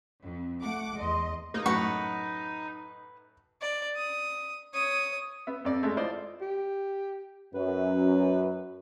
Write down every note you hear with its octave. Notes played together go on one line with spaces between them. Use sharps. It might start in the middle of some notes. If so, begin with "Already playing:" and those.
F2
A3 F#5 D6
E2 D#5 C6
A#3 D#4
F#2 A2 B4 F#5 C#6
D5
D#6
C#5 D#6
B3 E5
F2 D5
G#3 A3
E4 F4 C5 D5 D#5
G4
F#2 B4